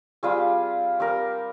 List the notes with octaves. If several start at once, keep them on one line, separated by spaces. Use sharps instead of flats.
G3 C4 F4 G#4
C4 G4 A#4